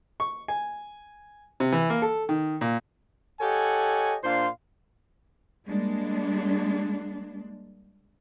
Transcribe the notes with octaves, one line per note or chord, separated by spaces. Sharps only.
C#6
G#5
C3
E3
A#3
A4
D#3
A#2
G4 A4 C#5 D#5 F#5 G#5
A#2 D4 C5 F5 C6
G3 G#3 A#3 D4